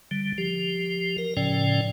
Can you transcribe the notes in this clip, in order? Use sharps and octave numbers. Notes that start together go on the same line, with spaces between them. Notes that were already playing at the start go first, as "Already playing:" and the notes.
D3 G3
F3 G4
A#4
A2 C#3 F3 C#4 D5 G5